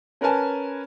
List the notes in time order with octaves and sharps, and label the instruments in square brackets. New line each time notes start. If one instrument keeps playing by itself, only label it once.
[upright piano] C#4 A#4 B4 G#5 A5